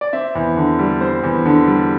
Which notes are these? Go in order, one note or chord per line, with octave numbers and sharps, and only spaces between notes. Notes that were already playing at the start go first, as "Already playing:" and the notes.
D5
C4 E5
E2
D3
G3
C4 C5
E2
D3
G3